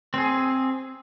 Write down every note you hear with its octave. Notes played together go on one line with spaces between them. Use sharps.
C4 G#4